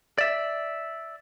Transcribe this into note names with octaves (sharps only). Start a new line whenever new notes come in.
D5 E5